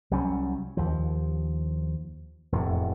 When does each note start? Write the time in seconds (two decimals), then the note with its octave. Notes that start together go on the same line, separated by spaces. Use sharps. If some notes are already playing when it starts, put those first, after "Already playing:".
0.11 C2 F#3 G3 C#4
0.77 D#2 F3
2.52 E1 F2 A2